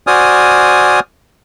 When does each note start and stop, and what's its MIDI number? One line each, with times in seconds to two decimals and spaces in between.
0.07 1.00 66
0.07 1.00 72
0.07 1.00 74
0.07 1.00 80
0.07 1.00 87
0.07 1.00 89